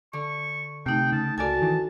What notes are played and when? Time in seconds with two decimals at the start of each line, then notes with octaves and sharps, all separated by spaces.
0.13 D3 C#6
0.86 C3 A3 D#4 G5
1.12 C#3 A5
1.38 C#2 F#4 A4 A#4 D5 G#5 A5
1.62 D#3 E3